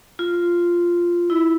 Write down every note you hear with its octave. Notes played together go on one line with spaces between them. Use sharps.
F4
E4